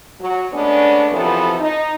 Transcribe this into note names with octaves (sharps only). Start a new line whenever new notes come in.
F#3
G#3 A3 B3 C#4 D4
F#2 C3 E3 F3 B3 A4
D#4